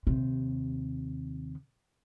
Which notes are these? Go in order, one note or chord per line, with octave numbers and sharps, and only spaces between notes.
D#2 C3